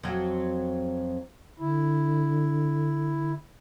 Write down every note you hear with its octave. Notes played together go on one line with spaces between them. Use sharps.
F2 F#3
D3 E4